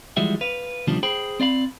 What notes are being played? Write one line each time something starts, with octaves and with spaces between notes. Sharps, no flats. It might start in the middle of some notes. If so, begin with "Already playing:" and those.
E3 F3 G3 G#3 F#4 E5
B4 F5
D2 B2 D#3 F3 G3 D4
G#4 C5 G5 B5
C4 D5 F5 B5